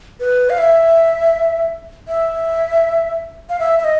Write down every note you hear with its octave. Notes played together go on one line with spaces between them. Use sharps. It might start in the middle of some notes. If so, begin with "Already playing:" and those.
B4
F5
E5
E5
F5
E5
E5
D#5